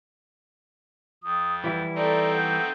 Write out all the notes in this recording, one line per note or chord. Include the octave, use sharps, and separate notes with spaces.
F2 D#6
E3 G3 E4 F#5
A3 C4 D#4 A4 D5 A#5
F#5 G6